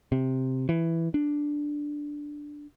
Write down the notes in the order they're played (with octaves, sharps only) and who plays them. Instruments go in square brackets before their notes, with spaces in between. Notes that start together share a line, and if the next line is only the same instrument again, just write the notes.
[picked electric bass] C3
E3
D4